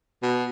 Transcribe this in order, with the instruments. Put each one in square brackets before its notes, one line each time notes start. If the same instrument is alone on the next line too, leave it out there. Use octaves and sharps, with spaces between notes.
[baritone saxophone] B2